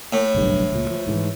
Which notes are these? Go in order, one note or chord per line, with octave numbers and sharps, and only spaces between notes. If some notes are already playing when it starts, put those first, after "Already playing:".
A2
F#1 B1 G2
C#2 A#2
F3
G#2 D#3 E3